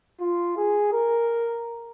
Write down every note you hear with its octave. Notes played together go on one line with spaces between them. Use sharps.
F4
G#4
A#4